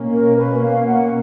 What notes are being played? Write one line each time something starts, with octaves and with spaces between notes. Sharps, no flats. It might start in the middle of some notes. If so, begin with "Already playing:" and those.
Already playing: B2 A#3 C#4
A#4
B4
F5
F#5